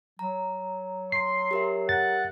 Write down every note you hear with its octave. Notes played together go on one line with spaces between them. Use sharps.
F#3 A#5
C6 C7
G4 A#4 E5
F#5 A6